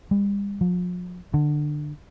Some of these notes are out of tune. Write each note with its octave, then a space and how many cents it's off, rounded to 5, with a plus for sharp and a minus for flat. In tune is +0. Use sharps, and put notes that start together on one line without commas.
G3 +40
F3 +40
D3 +20